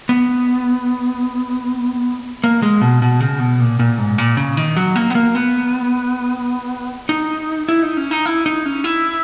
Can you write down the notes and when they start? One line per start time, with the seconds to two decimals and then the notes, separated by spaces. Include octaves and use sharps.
0.09 B3
2.44 A#3
2.62 G#3
2.81 B2
3.02 B2
3.21 C#3
3.40 B2
3.60 A#2
3.79 A#2
3.98 G#2
4.18 A#2
4.37 C#3
4.57 D#3
4.77 F#3
4.96 A#3
5.10 B3
5.15 A#3
5.35 B3
7.09 D#4
7.69 E4
7.83 D#4
7.97 C#4
8.11 D#4
8.26 E4
8.46 D#4
8.66 C#4
8.84 E4